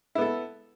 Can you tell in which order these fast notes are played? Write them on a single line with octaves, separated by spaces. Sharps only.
E4 B3 A4